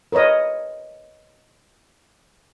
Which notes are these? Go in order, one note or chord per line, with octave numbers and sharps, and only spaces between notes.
A#4 B4 C#5 D#5